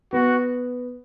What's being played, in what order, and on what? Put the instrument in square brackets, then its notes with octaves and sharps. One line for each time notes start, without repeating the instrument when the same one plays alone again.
[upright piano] B3 [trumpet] F#4